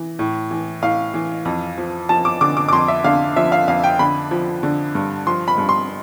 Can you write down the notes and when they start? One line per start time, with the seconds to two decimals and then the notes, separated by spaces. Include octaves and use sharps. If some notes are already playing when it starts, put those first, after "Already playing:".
Already playing: E3
0.19 A2
0.51 E3
0.82 A2 F5
1.14 E3
1.45 F2
1.78 F3
2.09 F3 A5
2.25 D6
2.41 D3 D6
2.57 D6
2.69 D6
2.73 F2 C6
2.88 E5
3.04 D3 F5
3.36 F3 E5
3.52 F5
3.68 F2 F5
3.84 G5
3.99 D3 B5
4.31 F3
4.63 D3
4.95 G2
5.27 F3 C6
5.48 B5
5.58 G2
5.69 C6